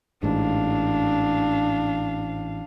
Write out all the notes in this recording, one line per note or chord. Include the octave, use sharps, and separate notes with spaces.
A1 G#2 D4 F5